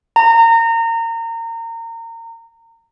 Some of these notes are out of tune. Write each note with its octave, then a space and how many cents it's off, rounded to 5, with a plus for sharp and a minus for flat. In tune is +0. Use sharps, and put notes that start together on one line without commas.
A#5 -30